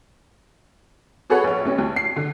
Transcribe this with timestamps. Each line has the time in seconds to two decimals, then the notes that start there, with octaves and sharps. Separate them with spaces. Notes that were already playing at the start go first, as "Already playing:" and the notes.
1.30 F#4 G#4 A4 B4 C#5 F#5
1.44 A#1 C#5
1.65 A1 C#4
1.78 D2
1.96 C7
2.16 D3